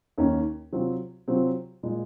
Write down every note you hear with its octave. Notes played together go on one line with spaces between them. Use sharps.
D#2 D#3 A#3 C#4
C3 F#3 C4 F4
C3 F#3 C4 F4
A#2 G#3